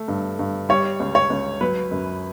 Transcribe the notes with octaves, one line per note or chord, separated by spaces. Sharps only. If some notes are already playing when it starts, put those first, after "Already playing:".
Already playing: A3
G2
G2
G3 C#5
C#2
C#5
C#2
F#3 B4
F#2